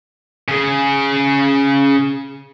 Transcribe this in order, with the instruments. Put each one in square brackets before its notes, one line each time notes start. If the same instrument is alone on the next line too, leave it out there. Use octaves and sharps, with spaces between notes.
[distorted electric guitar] C#3 G#4